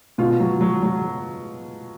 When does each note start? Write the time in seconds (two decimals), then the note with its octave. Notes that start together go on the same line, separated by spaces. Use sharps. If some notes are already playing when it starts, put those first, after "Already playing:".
0.18 B2 F4
0.40 F#3
0.61 F#3
0.83 F#3